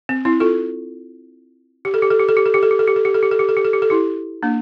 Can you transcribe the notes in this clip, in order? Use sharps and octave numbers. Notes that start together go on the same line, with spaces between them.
C4
C4 E4
F4 A4
G4
A4
G4
A4
G4
A4
G4
A4
G4
A4
G4
A4
G4
A4
G4
A4
G4
A4
G4
A4
G4
A4
G4
A4
E4 G4
A#3 D4